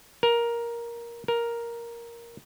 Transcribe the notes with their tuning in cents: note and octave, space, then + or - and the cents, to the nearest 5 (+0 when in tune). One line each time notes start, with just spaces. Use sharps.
A#4 +10
A#4 +5